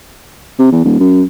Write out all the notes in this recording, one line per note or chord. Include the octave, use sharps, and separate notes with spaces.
C3
E2
D#1
F#2